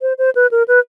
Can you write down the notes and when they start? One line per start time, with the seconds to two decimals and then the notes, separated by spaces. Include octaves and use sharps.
0.02 C5
0.18 C5
0.35 B4
0.51 A#4
0.68 B4